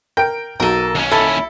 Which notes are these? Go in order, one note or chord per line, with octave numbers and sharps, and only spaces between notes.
A#4 G5 D7
B1 F#4 A4 A#4 D#7
D#2 C#4
E4 A4